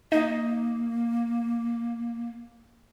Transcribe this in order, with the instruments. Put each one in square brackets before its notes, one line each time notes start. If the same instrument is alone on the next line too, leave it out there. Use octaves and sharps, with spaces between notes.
[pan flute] A#3 [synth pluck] D#4 D#5